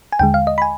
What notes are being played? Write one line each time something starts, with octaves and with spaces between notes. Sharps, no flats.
G#5
D#2 D3 G#3 G5
F5
D#5
B5
G#5